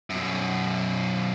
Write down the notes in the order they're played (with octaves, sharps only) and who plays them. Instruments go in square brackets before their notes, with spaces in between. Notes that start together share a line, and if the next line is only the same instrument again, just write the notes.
[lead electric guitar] F#2 B2